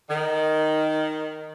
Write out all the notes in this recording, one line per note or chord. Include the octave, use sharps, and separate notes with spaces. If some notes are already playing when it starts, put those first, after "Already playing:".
D#3